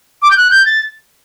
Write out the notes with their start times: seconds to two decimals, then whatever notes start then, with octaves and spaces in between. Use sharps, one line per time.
0.22 D6
0.31 G6
0.37 F#6
0.51 G6
0.65 A6